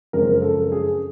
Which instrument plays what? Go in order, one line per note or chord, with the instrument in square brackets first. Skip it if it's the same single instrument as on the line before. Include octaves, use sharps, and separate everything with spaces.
[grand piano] F#2 C#3 F3 G#3 C4 A#4
A4
G#4